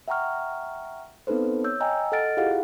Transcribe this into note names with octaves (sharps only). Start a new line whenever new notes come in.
E5 F#5 G5 A#5 C#6 F6
B3 C4 D#4 A4 B4 C5
C#5 E6 G6
D#5 G5 G#5 A#5 E6
A4 D#5 F#5 F6 A6 D7
E4 F4 G4 G#4 F5 F#5